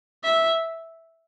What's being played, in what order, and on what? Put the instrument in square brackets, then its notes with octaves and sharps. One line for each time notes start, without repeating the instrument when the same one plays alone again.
[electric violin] E5